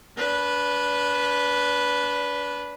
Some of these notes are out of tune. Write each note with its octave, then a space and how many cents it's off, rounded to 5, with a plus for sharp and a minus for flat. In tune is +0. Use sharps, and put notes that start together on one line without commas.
D4 -30 B4 -5